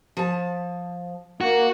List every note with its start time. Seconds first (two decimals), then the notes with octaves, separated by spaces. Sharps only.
0.17 F3 A5
1.41 A#3 F#4